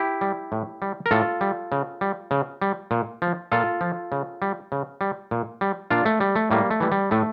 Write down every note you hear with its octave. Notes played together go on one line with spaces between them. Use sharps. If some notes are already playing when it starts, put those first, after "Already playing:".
Already playing: E4 G4
G3
A2
G3
A#4
A2 F4 A4
G3
C#3
G3
C#3
G3
A#2
F3
A#2 F4 A4
F3
C#3
G3
C#3
G3
A#2
G3
A#2 D4 F4
A3
G3
A3
A2 G3 A#3
A3
E3 G3
G3
A2 A3